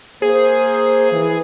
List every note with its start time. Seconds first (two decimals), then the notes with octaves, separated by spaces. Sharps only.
0.22 A#3 G#4 C5
1.12 E3